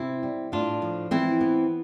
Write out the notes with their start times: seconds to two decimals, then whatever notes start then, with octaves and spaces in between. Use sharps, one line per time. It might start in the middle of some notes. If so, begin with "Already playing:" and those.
Already playing: C3 C4 E4
0.23 G3
0.52 A2 D4 F4
0.82 F3
1.11 E3 C4 E4
1.41 B3